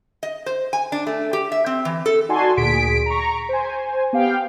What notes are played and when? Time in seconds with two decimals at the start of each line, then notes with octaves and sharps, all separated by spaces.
0.23 D#5
0.46 C5
0.73 G#5
0.92 D4
1.07 A3
1.33 G4
1.52 E5
1.66 C4
1.85 E3
2.06 A4
2.29 D#4 F#4 D5 G#5 A5 C6
2.57 D2 A#2 G#4 B6 D7
3.06 A#5 C#6
3.49 C5 G#5
4.13 B3 G4 F5 G5